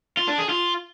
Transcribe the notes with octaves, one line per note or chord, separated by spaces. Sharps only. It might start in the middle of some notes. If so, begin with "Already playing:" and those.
F4
D4
G#4
F4